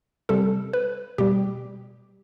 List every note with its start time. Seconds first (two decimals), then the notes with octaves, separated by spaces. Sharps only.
0.29 C3 G3 A4
0.73 B4
1.18 B2 G3 G4